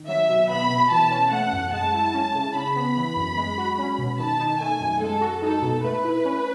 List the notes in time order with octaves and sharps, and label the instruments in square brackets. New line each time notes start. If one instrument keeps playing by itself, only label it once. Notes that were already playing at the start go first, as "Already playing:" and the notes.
Already playing: [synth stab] D#3
[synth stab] F#3 [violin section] E5
[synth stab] B2
[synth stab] B3 [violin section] B5
[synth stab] B2
[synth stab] E3 [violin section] A5
[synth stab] C#4
[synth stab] A3 [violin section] F#5
[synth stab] F#2
[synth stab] G#3 [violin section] A5
[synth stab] E4
C#4
C#3
[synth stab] C#3 [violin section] B5
[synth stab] B3
E3
F#2
G#3
F#4
C#4
B2
[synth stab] D#3 [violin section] A5
[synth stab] D#4
[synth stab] A3 [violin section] G#5
[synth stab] F#2
[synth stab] G#3 [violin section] A4
[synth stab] F#4
[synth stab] D#4 [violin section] A4
[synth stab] B2
[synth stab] A3 [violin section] B4
[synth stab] E4
C#4